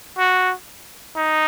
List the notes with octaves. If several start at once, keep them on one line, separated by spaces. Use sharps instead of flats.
F#4
D#4